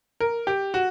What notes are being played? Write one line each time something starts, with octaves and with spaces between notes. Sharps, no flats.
A#4
G4
F#4